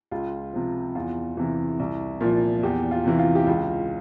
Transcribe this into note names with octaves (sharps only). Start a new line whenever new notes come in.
C#2 F4
C3 F3
E2 F4
C3 E3
C2
A#2 F3
E2 G4
F4
C3 E3
F4
G4
C#2 F4